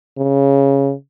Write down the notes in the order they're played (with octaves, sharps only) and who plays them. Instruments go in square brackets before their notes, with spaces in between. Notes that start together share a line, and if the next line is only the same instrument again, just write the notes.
[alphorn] C#3